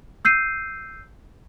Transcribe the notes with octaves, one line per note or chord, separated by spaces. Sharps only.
E6 G6 C7 D#7